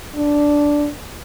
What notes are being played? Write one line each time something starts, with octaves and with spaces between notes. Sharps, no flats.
D4